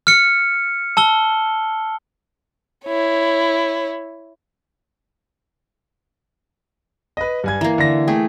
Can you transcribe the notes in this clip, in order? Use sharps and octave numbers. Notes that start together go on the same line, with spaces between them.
F6 C#7
A5 E6 G7
E4 C#5
B4 D#5
G2 G#5 G#6
E3 A#3 A#5
D3 A#6
A3 G#4 G5